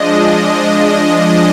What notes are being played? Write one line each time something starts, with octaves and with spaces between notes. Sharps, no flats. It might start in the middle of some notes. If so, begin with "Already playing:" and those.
Already playing: F3 G#3 D4 D#5
D#5